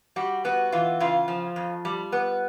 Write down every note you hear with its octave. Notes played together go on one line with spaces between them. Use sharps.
G3 F#4
B3 F#4
E3 F4
C#3 F4
F3
F2
G3
B3